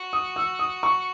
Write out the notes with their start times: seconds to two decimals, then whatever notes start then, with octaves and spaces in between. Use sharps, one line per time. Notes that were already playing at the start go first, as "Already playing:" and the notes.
Already playing: F#4
0.13 D#6
0.36 E6
0.59 D#6
0.83 C#6